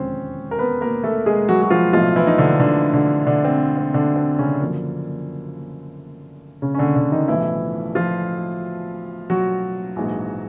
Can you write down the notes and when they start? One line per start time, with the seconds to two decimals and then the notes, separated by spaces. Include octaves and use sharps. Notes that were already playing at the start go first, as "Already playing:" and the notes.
Already playing: E1 D#2 D3 F3 G#3 C4 C#4 C5
0.51 A#4
0.59 B3 B4
0.81 A#3 A#4
1.03 A3 A4
1.26 G#3 G#4
1.49 F#3 F#4
1.62 F#4
1.70 F3 F4
1.93 B1 A2 F3 F#3 A3 F4
2.16 E3 E4
2.27 D#4
2.38 D3 D4
2.60 D3 D4
2.93 D3 D4
3.27 D3 D4
3.44 C4
3.77 C4
3.94 D3 D4
4.16 C4
4.39 C#3 C#4
4.61 F#2 D3 F3 A#3
6.62 C#3 C#4
6.74 C#4
6.78 D3 D4
6.95 D3 D4
7.12 D#3 D#4
7.28 B1 A2 E3 F3 A3 E4
7.95 F3 F4
9.30 F#3 F#4
9.96 A#1 G#2 E3 G#3